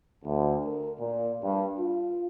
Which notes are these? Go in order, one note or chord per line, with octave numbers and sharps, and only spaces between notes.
D2
A#4
A#2
G2
F4